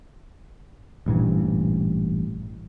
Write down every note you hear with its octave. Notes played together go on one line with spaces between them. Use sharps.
A1 G2 A#2 E3